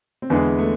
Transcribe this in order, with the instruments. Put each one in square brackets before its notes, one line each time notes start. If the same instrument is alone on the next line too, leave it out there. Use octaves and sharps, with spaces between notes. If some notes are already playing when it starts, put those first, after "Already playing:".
[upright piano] C4
[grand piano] E2 D3 G#3 [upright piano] B3
[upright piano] A3